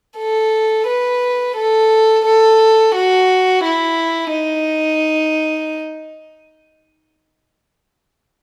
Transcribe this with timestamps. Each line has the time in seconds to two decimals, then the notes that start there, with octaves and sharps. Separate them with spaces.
0.18 A4
0.87 B4
1.56 A4
2.26 A4
2.96 F#4
3.65 E4
4.34 D#4